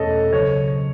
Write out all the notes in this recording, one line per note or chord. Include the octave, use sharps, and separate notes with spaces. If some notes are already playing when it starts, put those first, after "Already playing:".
Already playing: E2 B2 A3 C#4 A4 C#5 D#5
C#2 C#3 F#3 C#5